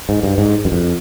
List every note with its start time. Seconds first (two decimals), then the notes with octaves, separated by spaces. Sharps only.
0.09 G#2
0.23 G2
0.38 G#2
0.65 F#2
0.72 F2